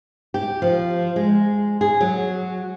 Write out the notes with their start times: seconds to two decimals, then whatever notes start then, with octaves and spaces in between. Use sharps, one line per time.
0.34 G4
0.62 F3
1.16 G#3
1.81 G#4
2.01 F#3